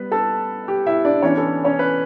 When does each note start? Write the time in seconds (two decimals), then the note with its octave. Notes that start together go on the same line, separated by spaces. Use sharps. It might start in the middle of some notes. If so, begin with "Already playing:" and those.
Already playing: G3 B3 B4
0.12 A4 A5
0.68 G4 G5
0.86 E4 E5
1.05 D4 D5
1.22 E3 B3 C#4 D4 C#5
1.38 A4
1.65 C#4 C#5
1.79 B4